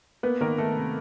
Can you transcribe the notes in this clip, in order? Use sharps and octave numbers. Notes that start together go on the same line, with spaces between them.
A#3 B3 B4
D#3 A#3 A#4
D#3 A3 A4
C3